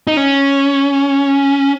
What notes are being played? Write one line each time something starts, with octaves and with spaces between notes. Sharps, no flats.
D#4
C#4